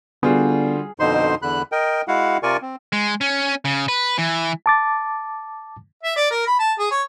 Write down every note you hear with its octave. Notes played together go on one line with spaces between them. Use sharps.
D3 G3 B3 F4 F#4 G#4
F2 B2 D3 D#4 C5 C6
E2 D3 B5 F#6
A#4 D#5 G5
G#3 E4 F#4 F5 F#5
C3 F4 A#4 D5 G#5 C#6
C4
G#3
C#4
C#3
B4
E3
A5 D6 A6
E5
D5
A#4
B5
A5
G#4
C#5